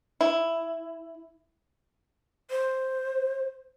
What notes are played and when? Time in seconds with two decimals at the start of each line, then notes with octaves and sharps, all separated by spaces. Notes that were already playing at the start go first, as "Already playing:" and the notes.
0.21 E4
2.51 C5